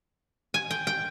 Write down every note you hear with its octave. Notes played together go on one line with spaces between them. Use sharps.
G#5
G5
G5